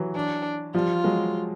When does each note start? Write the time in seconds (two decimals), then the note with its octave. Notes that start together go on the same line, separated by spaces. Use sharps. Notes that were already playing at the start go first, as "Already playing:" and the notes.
Already playing: E3 F#3
0.15 D4
0.74 F3 G3 F4
1.04 F#3 G#3